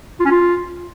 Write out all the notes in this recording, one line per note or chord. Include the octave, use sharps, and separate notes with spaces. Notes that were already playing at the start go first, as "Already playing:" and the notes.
F4
C#4
F4